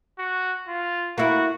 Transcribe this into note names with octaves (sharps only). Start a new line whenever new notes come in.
F#4
F4
A#3 E4 F#4